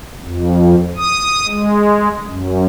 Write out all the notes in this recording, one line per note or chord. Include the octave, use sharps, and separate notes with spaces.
F2
D#6
G#3
F#2